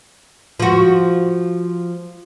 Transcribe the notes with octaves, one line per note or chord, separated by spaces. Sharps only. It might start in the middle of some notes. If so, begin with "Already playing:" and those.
F3 F#4